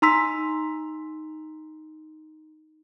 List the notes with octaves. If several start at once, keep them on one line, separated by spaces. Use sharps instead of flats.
D#4 A#5 C6 E6 B6